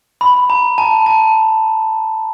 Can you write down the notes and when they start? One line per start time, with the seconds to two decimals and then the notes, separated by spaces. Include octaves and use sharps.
0.21 B5
0.50 A#5
0.78 A5
1.06 A5